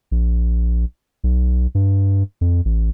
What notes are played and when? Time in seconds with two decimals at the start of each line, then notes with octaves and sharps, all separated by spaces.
0.11 A#1
1.24 B1
1.75 G2
2.41 F2
2.65 A1